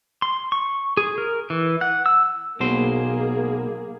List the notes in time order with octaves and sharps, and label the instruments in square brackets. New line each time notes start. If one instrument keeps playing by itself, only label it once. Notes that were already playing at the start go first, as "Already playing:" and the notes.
[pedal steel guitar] C6
C#6
G#4
A#4
E3
F#5
E6
[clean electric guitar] B1 B2 C5 [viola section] A#3 G#4